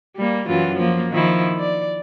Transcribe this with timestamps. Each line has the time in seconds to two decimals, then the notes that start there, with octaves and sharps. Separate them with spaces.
0.17 G3 A#3
0.48 F#2 E3 F4
0.76 F3 A#3
1.12 D#3 F3 E4
1.59 D5